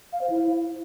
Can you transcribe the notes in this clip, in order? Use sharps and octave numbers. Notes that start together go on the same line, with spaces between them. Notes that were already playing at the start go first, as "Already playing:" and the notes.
F5
C5
E4